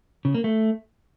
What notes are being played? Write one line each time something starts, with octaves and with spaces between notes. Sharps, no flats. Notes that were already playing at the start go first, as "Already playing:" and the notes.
C#3
A#3
A3